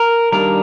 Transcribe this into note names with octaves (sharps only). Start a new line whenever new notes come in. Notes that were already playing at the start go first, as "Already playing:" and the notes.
Already playing: A#4
D#3 G3 A#3 D4 A#4